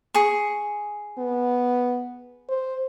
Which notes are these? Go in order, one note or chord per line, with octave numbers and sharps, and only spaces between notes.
G#4 C#6
B3
C5